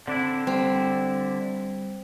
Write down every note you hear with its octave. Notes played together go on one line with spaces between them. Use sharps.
D3 C4 D4 E4
G3 C4